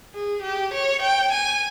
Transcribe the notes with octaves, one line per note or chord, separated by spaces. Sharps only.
G#4
G4
C#5
G5
G#5